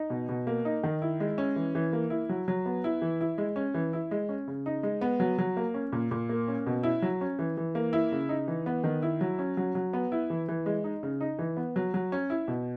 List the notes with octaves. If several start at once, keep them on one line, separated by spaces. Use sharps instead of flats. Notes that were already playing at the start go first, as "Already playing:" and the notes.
Already playing: D#4
B2
B2
A#3
D#4
D#3
E4
G#3
C#4
E3
E3
A#3
E4
F#3
F#3
B3
E4
E3
E4
G#3
C#4
E3
E4
G#3
C#4
C#3
D#4
G#3
B3
F#3
F#3
A#3
C#4
A#2
A#2
A#3
C#4
B2
E4
F#3
C#4
E3
E3
A#3
E4
C#3
D#4
E3
B3
D#3
E4
F#3
C#4
F#3
F#3
B3
E4
E3
E3
G#3
D#4
C#3
D#4
E3
B3
F#3
F#3
C#4
E4
B2